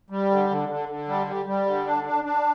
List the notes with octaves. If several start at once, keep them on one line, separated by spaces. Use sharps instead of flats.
G3
D3
D3
D3
D3
G3
G3
G3
D3
D4
D4
D4